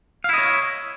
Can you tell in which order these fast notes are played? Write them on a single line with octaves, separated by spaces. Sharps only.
F5 E4 D#5 C#5